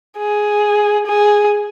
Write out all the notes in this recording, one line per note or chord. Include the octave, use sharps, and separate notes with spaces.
G#4
G#4